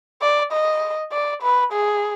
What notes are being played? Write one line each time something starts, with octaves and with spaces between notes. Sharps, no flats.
D5
D#5
D5
B4
G#4